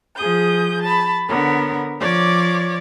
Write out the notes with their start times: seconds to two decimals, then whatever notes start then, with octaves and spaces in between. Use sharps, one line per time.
0.16 F3 G#4 D#6 G6
0.81 A5 B5
1.28 D3 B3 A#4 C#5
1.98 F3 C#5 D5 D6